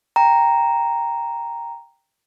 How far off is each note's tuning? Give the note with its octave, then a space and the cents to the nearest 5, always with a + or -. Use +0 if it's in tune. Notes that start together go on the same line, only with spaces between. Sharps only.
G5 +5 A#5 +0